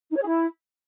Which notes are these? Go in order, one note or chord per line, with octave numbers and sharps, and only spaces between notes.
D#4
C#5
G#4
E4